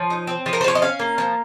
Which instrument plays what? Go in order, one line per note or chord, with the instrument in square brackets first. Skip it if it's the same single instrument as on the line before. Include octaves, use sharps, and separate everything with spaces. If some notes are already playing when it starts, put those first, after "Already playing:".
Already playing: [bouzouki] F3 C#5
D#4
C4
F3
A#4
C5
F3 C#5
D#5
C#4 F5
A#3
F3